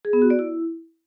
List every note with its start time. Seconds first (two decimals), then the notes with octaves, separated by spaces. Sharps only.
0.05 G#4
0.13 B3
0.22 F#4
0.30 D5
0.39 E4